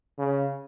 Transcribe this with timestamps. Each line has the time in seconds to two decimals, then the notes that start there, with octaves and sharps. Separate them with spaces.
0.18 C#3